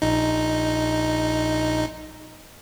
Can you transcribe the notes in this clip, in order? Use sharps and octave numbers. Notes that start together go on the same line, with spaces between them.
A#1 D#4